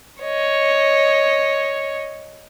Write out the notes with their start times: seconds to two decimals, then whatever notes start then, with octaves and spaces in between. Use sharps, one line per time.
0.22 C#5 D#5